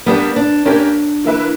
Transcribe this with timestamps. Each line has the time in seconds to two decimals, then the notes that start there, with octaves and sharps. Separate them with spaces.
0.06 G3 A#3 B3 D4 G4
0.36 D4
0.65 A#3 C#4 D4 G4 A#4 C#5
1.24 E3 A#3 E4 B4